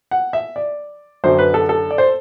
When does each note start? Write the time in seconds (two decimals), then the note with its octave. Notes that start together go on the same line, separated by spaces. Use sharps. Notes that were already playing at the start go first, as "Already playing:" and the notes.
0.11 F#5
0.33 E5
0.56 D5
1.24 F#2 D3 F#3 C5
1.39 B4
1.54 A4
1.69 A4
1.91 D5
1.98 C5